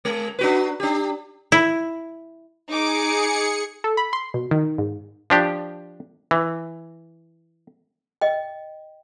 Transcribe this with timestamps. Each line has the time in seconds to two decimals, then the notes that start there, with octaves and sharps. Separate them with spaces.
0.05 G#3
0.39 D4 F#4 B4
0.80 D4 G4
1.52 E4
2.71 D#4 G#4 D6 C#7
3.84 A4
3.97 B5
4.13 C6
4.34 B2
4.51 D#3
4.78 G#2
5.30 F3 D4 G4
6.31 E3
8.21 D#5 G5